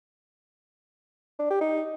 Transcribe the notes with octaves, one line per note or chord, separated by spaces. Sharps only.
D4
G4
D#4